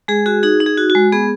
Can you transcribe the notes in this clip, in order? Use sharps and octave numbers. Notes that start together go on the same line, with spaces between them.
G#3 G#4
F#4 G#4
D#4 G#4
D#4
G#4
F#4
F#4
G#3
B3 G#4